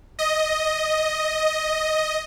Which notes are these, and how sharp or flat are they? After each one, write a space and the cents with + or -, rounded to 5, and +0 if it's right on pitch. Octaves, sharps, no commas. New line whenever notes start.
D#5 +5